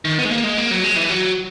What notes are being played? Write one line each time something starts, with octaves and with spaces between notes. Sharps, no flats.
D#3
B3
G#3
A#3
G#3
A#3
F#3
G#3
E3
F#3